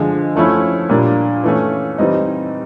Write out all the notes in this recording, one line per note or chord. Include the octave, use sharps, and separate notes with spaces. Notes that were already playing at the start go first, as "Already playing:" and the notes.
Already playing: D3 F3 G#3
F3 A3 C#4 E4
A#2 G3 A#3 D4
E3 A3 C#4
E3 G3 C4 D#4